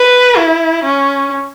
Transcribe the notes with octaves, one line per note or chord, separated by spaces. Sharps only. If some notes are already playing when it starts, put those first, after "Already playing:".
Already playing: B4
E4
C#4